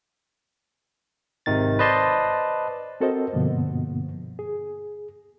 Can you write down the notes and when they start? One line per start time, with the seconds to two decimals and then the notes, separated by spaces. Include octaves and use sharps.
1.46 G#1 C3 D#3 A6
1.79 B4 C5 D5 D#5 A5 C6
3.00 C4 F#4 A4 A#4 C5 D#5
3.33 G2 B2 D3 F3 A#3 B3
4.39 G#4